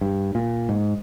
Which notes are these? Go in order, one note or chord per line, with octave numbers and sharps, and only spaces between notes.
G2
A#2
G#2